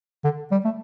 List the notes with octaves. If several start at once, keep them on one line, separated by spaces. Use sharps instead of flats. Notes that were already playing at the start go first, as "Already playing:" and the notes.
D3
G3
A3